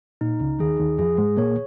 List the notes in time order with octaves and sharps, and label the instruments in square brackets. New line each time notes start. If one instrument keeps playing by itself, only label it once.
[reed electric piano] A#2 [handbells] D#4
[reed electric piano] C#2 C#3
[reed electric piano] D#2 D#3 [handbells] G#4
[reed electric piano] D#2 D#3
[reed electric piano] F2 F3 [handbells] G#4
[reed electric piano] G#2 G#3
[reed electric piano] A#2 A#3 [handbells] C#5